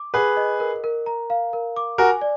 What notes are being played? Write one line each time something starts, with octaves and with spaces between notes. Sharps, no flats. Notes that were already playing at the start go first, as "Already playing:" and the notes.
Already playing: D6
G#4 B4 F#5
D#5
A#4
A#4
A#5
F5
A#4
D6
F#4 A#4 G#5
D5